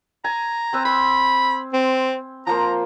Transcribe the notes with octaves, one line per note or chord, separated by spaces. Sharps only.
G#5 A#5
C4 B4 E6
B5 C6
C4
F3 A#3 C5 A#5